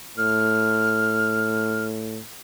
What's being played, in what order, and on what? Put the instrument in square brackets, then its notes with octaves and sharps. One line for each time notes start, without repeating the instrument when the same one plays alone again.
[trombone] A2 [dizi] F6